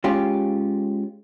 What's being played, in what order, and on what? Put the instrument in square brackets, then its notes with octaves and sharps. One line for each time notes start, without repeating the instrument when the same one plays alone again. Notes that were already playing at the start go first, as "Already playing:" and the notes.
[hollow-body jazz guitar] G#3 C#4 F4 G4